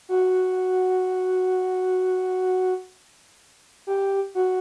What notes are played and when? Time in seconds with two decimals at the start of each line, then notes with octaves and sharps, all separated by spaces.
0.09 F#4
3.87 G4
4.35 F#4